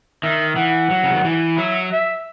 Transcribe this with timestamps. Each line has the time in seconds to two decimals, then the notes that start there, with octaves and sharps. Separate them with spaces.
0.23 D#3 E5
0.56 E3 F#5
0.90 F#3
1.04 C#3
1.13 D#3
1.25 E3
1.57 F#3 E5
1.92 E5